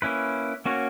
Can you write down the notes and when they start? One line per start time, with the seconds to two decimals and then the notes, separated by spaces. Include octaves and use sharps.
0.02 A#3 C#4 E4 B4
0.66 A#3 C#4 F#4 C#5